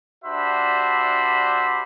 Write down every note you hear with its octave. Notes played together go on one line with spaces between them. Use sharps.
G3 D4 F#4 C5 E5 B5